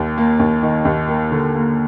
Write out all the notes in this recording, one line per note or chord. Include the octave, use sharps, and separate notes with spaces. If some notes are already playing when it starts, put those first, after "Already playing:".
Already playing: D#2
A#3
D#2
D#3
D#2
A#3
D3
A#3